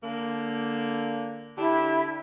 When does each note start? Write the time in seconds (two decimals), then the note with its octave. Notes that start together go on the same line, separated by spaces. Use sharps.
0.02 D3 A#3
1.58 D3 D4 E4 G4